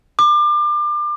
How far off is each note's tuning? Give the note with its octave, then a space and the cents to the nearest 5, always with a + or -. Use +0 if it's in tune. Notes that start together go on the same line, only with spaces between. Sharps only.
D6 +30